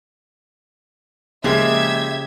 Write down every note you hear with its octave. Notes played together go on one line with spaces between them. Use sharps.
C#3 F3 G#3 A#3 G4 G#4 E5 G#6